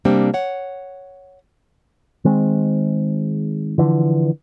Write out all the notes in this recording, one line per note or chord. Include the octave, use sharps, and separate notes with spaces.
C3 G3 A#3 C4 D4 G5
C#5 F#5
D#3 G#3 C4
D3 E3 F3